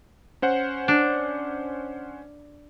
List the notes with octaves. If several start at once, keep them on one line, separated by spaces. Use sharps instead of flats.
C#4 C5 F#5
D4